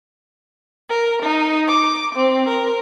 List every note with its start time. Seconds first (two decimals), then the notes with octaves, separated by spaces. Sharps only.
0.89 A#4
1.22 D#4
1.68 D6
2.15 C4
2.48 A#4